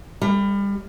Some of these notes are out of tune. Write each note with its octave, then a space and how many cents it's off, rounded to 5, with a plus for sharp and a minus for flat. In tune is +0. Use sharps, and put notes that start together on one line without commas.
G3 +30